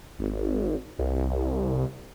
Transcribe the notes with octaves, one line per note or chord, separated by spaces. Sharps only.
G#1
C2